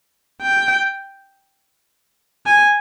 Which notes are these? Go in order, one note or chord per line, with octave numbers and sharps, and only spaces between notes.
G5
G#5